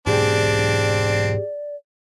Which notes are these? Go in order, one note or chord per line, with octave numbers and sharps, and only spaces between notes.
G#2 B2 E3 C4 D4 G4 G#4 D5